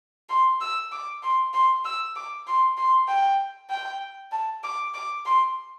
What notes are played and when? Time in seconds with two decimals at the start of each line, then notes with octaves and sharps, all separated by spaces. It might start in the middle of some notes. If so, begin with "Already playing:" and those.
0.29 C6
0.61 E6
0.92 D6
1.23 C6
1.54 C6
1.85 E6
2.16 D6
2.47 C6
2.77 C6
3.08 G5
3.70 G5
4.32 A5
4.64 D6
4.94 D6
5.26 C6